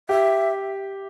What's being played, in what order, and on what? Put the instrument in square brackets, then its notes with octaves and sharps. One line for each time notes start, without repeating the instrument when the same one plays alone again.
[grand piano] G4 [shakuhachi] E5